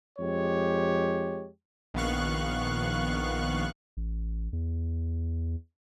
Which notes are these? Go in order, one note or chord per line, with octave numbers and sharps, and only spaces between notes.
F2 G#3 G4 C#5
A#1 D#3 B3 F5 C#6 F#6
A1
E2